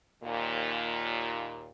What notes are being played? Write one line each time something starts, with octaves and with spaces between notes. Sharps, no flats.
D#2 A#2